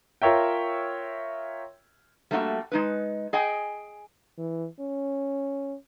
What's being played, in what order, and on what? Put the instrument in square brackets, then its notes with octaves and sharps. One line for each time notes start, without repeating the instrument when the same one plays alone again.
[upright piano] F4 A#4 C#5 E5 G5
[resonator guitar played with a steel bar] G3 A3 A#3 D4 F#4 E5
G#3 D#4 B4
G#4 D#5 G5 G#5
[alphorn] E3
C#4